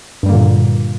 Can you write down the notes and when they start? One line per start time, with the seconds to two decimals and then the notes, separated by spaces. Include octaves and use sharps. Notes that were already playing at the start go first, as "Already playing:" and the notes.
0.23 G2
0.26 G3
0.29 A#3
0.32 D3
0.35 A#2